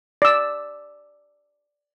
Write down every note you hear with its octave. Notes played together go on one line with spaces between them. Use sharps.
D5 E6